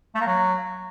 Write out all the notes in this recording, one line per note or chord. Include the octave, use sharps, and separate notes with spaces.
A3
A#3
F#3